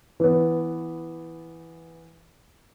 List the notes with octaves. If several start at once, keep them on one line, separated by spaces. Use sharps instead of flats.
E3 B3